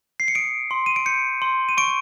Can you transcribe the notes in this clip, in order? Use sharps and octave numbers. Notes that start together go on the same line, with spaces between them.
C7
C#7
D#6 D7
C6
D#7
D7
G6 C#7
C6
D#7
C#6 D7